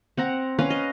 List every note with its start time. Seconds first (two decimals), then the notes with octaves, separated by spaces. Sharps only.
0.17 C4 F#5 A#5
0.59 C#4 B4 F5 A#5
0.70 D#5